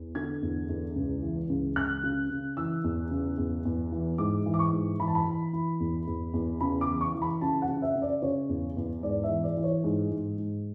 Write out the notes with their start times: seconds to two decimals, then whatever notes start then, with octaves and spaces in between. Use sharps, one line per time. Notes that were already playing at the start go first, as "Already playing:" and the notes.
Already playing: E2
0.15 D3 G#6
0.42 E2
0.69 E2
0.96 C#2
1.23 E3
1.49 C#2
1.76 C#2 F#6
2.03 C#3
2.30 C#3
2.57 E3 E6
2.84 E2
3.11 C#3
3.38 E2
3.65 E2
3.92 E3
4.18 G#2 D6
4.46 E3
4.54 D6
4.59 C#6
4.72 G#2
4.99 E3 B5
5.08 A5
5.15 B5
5.27 E3
5.53 E3
5.80 E2
6.07 E2
6.33 E2
6.61 C#3 B5
6.81 D6
6.87 E3
7.01 C#6
7.14 E3
7.22 B5
7.41 C#3 A5
7.62 F#5
7.68 C#3
7.82 E5
7.95 C#3
8.02 D5
8.22 C#3 C#5
8.49 E2
8.77 E2
9.03 G#2 D5
9.23 E5
9.30 E3
9.43 D5
9.57 E3
9.63 C#5
9.84 G#2
10.11 G#2
10.38 G#2